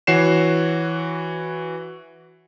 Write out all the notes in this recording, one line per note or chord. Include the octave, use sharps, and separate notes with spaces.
E3 F#4 C#5 C7 E7